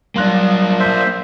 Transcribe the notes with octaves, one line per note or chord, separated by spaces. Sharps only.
F#3 G3 A#3 D4 C6 F#6
C5 E5